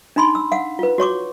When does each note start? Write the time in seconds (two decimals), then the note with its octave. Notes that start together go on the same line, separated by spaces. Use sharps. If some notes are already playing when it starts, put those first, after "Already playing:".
0.16 D4 D#4 B5 C6
0.35 E6
0.52 F5 F#5
0.79 F4 B4
0.98 F#4 C#5 C#6 D6